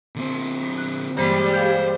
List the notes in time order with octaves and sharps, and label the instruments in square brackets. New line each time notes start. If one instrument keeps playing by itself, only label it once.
[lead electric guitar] D3 C4
[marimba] F#6
[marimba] G2 E3 A#3 [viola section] G3 G#3 [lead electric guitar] C5 B5
[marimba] G#4 F5 G6